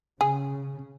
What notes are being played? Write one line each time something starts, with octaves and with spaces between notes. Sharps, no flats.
C#3 G#4